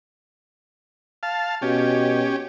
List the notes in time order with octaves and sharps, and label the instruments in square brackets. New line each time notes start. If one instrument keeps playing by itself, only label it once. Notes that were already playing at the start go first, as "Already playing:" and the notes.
[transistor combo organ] F5 A5
[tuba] B2 [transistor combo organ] C#4 G4